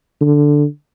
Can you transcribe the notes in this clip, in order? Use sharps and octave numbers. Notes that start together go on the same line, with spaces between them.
D3